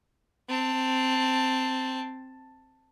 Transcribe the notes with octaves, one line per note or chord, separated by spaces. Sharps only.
C4 A5